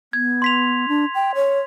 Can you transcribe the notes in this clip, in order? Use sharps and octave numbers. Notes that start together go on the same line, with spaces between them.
B3 G#6
C6 B6 F7
D4
G5
C#5